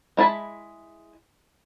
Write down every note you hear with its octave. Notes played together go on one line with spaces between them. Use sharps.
G#3 E4 A5 B5